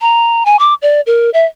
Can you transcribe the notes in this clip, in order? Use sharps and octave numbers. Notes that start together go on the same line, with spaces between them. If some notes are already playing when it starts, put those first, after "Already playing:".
A#5
G#5
D6
D5
A#4
E5